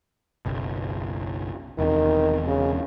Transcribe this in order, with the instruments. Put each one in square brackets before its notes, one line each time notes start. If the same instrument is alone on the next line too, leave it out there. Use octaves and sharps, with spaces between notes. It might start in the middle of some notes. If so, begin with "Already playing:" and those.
[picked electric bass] F#1 B1
[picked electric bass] E1 E2 C3 [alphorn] D#3
[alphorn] C#3